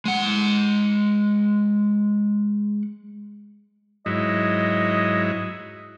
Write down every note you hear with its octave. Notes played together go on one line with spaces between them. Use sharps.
G#3 F#5
G#2 F#3 E4 D#5